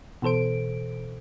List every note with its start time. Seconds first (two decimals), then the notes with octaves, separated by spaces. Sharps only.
0.22 B2 E3 A4 C5 D7